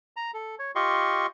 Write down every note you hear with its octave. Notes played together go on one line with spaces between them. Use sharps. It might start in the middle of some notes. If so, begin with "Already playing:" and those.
A#5
A4
C#5
F4 G4 D#5 C6 C#6